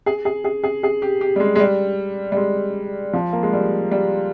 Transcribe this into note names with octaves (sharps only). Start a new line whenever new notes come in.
G#4
G#4
G#4
G#4
G#4
G4
G4
G3
G#3
G#3
G3
G3
G#3
F3
A#3
G#3
G3
G3